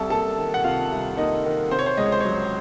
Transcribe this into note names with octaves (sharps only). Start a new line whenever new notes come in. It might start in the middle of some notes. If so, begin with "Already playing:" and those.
Already playing: C2 C3 A4 A5
A#3 A4 A5
D#3
F#5
C3 F4 F5
C2
A#3 D#4 D#5
D#3
C3 C5
C#5
C5
C#2 D#5
C#5
C5
F#3 C#5